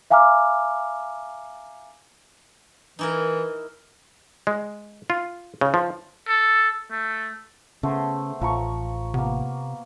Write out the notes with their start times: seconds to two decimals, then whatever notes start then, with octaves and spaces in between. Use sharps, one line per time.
0.11 E5 F5 G#5 A#5 D6 F6
2.99 E3 D#4 E4 A#4
4.47 G#3
5.10 F4
5.61 C#3
5.74 F3
6.28 A4
6.90 A3
7.83 C#3 A3 B3 C5
8.41 A1 F3 A#5 C#6
9.14 C3 A#3 B3